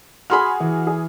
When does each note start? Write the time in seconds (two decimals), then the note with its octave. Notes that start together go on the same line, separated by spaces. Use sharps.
0.30 F#4 G#4 B5 C6 F6
0.60 E3
0.87 G#4